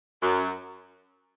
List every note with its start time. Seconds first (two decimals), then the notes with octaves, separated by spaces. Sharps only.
0.21 F#2